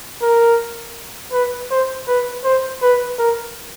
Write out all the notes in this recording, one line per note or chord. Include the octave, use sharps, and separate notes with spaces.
A#4
B4
C5
B4
C5
B4
A#4